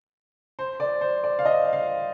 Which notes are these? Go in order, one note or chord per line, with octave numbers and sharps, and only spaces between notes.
C5
D5
C5
D5
F5
D#5
F5